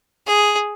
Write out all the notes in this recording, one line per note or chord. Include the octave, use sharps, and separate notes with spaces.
G#4